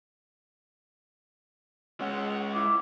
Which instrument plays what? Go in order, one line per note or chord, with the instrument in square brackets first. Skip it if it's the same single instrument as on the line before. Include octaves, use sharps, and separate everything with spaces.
[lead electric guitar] G#3 C#4 [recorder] F#5
[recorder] E4 [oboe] D6